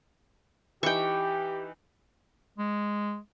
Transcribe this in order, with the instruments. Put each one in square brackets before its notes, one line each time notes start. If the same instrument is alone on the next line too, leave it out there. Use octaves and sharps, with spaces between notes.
[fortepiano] E3 D#4 [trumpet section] G4 [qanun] G5 C#6
[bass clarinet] G#3